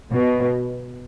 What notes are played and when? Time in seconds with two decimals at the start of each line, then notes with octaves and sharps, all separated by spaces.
0.12 B2